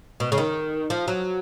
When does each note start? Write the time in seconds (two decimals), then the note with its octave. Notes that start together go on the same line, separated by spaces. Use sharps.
0.20 B2
0.32 C#3
0.38 D#3
0.90 F3
1.08 F#3